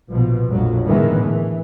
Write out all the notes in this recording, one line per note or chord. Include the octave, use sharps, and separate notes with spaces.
A#1 B2 F3
A#1 F2 F#3
D2 A2 D#3 E3 G#3 B3
E3